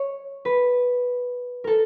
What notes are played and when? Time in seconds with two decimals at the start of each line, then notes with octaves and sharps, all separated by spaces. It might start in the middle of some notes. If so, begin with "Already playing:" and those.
Already playing: C#5
0.45 B4
1.64 A4 A#4